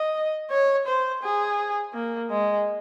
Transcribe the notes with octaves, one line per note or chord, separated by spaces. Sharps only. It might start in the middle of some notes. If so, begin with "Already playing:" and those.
Already playing: D#5
C#5
C5
G#4
A#3
G#3